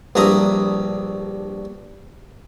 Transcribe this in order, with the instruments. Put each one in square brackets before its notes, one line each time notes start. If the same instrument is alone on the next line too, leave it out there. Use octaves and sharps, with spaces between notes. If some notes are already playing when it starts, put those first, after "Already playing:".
[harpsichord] A#1 G2 E4 A#5 B5 D#6